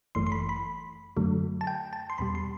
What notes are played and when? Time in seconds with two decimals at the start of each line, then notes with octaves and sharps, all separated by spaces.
0.15 G1 F#2 E3 A3 C6
0.27 C6
0.32 B5
0.49 B5
1.17 F#2 D3 F#3 A3
1.61 A5
1.67 G5
1.93 A5
2.10 C6
2.18 E2 B2 G3 B5
2.35 C6